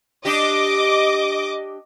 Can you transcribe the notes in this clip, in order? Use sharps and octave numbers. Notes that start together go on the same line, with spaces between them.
D4 G4 D#5 D6